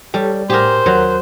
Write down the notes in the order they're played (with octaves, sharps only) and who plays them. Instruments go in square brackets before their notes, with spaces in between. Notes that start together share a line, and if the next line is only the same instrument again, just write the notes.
[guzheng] G3 [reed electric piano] G4 A4 C#5
[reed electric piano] A2 [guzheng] G4 G#4 A#4 [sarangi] C5
[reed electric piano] D#2 A#4 F#6 [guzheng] F#3